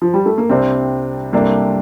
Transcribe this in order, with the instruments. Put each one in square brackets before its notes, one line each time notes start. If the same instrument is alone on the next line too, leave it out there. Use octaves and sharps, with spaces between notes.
[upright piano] F3
G3
A3
A#3
[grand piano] C2 C3 G3 D4 [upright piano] C4
[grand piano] C2 C3 G3 D4 A4 [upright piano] A#3